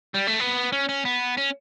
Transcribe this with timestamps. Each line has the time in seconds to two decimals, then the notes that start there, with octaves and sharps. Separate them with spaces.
0.14 G3
0.27 A3
0.40 B3
0.72 C#4
0.89 C#4
1.05 B3
1.37 C#4